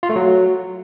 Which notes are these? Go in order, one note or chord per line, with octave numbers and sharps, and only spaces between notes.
F4
A3
F#3